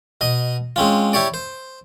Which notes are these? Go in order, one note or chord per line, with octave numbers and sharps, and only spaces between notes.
B2 D#5
G#3 C4 C#4 F4
E4 G4 C#5 D5
C5